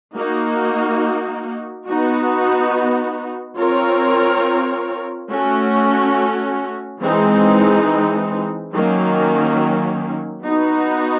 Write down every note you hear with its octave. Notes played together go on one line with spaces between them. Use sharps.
A#3 D#4 F#4
B3 D#4 F#4
C4 F4 A#4 C#5
A3 C#4 F#4
E3 G#3 C4 D#4
D#3 F#3 A#3 C#4
B3 D#4 F#4